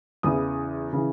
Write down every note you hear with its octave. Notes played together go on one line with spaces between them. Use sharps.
E2 C#3 E3 D#6
C#3 E3